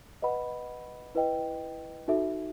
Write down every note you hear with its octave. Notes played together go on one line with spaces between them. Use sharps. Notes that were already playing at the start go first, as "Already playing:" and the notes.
B4 D#5 F#5 B5
E4 B4 D#5 G5
D#4 F#4 A4 E5